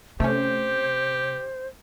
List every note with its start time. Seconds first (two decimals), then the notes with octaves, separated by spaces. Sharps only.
0.20 C3 A3 C#4 G4 C5